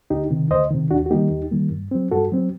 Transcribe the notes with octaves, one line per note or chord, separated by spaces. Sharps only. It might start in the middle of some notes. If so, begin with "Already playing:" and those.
D2 D#4 G4
C3 D#3
D2 C5 D#5
C3 D#3
D#2 D4 F#4
F#4
D#3 G3 A#3 D#4 G4
D#2
D#3 G3 A#3
G2
F#3 C4
G2 F#4 A4
F#3 C4